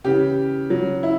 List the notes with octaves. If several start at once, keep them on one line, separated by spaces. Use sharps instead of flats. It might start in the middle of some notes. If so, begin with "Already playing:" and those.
C#3 E3 G4
C#3 F#3
E4